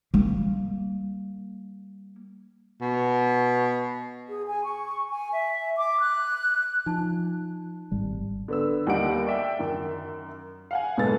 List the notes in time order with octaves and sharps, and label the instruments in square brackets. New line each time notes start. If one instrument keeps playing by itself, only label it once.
[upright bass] G3 A#3
[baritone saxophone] B2
[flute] G#4
G#5
C#6
G#5
E5
D6
F#6
[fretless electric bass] F3 [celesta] D#4 A5
[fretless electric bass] G#1 G3
[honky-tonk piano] D3 B3 E6
D#2 G3 D#4 G4 F#5 D7
D5 E5 G5
F#2 D#3
F5 F#5 G#5
F#1 G#2 B2 B3 A4 A6